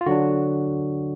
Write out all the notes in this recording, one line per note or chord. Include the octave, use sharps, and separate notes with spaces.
F4
D3 F#3 D4 F#4